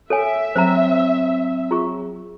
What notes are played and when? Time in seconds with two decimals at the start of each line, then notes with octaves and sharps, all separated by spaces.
0.10 A4 C#5 E5 G#5
0.56 F#3 C4 C5 A5 A#5
1.71 F4 G#4 C#6